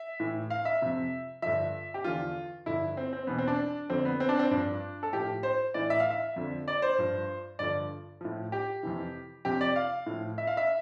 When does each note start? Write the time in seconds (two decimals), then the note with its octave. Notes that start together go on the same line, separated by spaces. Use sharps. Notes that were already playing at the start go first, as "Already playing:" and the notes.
Already playing: E5
0.20 A2 E3
0.50 F5
0.65 E5
0.81 F2 C3 F3
1.42 G2 D3 F3 E5
1.94 G4
2.04 E2 D3 F3 F4
2.66 G2 D3 F3 E4
2.97 C4
3.13 C4
3.27 E2 B2 B3
3.38 C4
3.48 D4
3.89 F2 D3 F3 C4
4.05 B3
4.20 C4
4.29 D4
4.39 C4
4.51 G2 F3 D4
5.03 A4
5.12 A2 F3 G4
5.43 C5
5.74 A2 E3 D5
5.90 E5
6.00 F5
6.10 E5
6.36 F2 D3 F3
6.68 D5
6.82 C5
6.98 G2 F3
7.59 G2 D3 F3 D5
8.21 A2 F3
8.52 G4
8.83 F2 C3 E3
9.45 F2 C3 F3 G4
9.61 D5
9.76 F5
10.06 A2 F3
10.38 E5
10.47 F5
10.57 E5